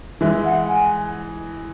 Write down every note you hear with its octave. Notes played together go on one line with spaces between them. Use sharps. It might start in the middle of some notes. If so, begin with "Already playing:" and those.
E3 G#3 E5
F#5
G#5